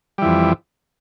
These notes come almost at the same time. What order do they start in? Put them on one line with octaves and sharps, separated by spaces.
G3 E3 F2